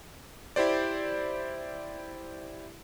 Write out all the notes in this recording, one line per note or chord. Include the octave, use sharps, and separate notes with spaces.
E4 G4 C5 D5